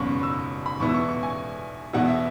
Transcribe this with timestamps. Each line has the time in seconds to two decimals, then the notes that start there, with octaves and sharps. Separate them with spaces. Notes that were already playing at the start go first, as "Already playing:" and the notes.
Already playing: F#1 E2 B2 F#3 C#4 B5 C#6
0.23 E6
0.66 B5
0.80 E2 B2 B3 E4 C#6
0.89 E6
0.94 C#6
1.09 C#6
1.23 G#5
1.93 E2 B2 B3 E4 F#5
2.08 E5